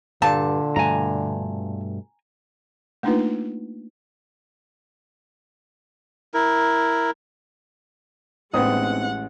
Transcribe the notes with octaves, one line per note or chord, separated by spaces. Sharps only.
G2 A#2 D3 A5
G2 B2 A3 G#5 A#5
A3 A#3 D4 D#4 F4 B4
E4 A#4
A1 G#3 B3 C4 D#4 F#5 D#6